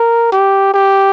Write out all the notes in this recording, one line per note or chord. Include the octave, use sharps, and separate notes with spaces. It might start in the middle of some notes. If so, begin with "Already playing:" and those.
Already playing: A#4
G4
G4